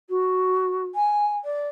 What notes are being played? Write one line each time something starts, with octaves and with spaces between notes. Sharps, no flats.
F#4
G#5
D5